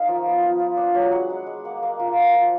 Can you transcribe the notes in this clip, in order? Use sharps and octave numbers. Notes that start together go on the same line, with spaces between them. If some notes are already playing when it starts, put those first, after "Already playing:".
Already playing: A#3 D#4 D#5 F5
F3
B3
F3
F4
D4
F#3
G#3 F#5
G#3
G#3
A#3 F#5
A#3
F4
F5
A#3 F#5
F3